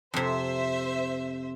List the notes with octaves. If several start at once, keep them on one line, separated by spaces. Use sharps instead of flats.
F2 C3 C5 E5